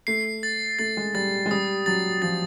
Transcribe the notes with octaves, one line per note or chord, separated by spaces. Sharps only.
A3 C7
A6
A3 A6
G#3
G3 A6
G#3
G3 D#6
F#3 A6
F3 A6